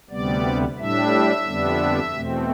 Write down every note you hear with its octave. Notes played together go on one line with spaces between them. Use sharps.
D2 C3 G3 B3 D5
A2 G3 D4 E5
F2 D3 G3 B3 D4
E2 B2 A3 C4